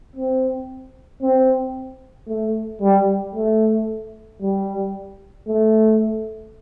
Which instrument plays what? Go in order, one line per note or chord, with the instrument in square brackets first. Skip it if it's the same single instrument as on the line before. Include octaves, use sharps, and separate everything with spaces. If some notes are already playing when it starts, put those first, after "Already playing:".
[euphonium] C4
C4
A3
G3
A3
G3
A3